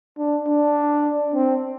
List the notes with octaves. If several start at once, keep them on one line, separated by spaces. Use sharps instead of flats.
D4
D4
C4